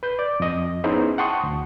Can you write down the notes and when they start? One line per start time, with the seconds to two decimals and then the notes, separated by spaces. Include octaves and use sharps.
0.03 B4 G6
0.19 D5
0.40 F2 D#5
0.84 B3 C#4 D#4 E4 G#4 C5
1.18 F#5 G5 A5 C6 C#6 D#6
1.43 D2